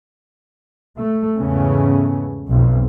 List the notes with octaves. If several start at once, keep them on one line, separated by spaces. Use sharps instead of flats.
A3
E2 G#2 C#3 A3 B3 C#4
B1 F2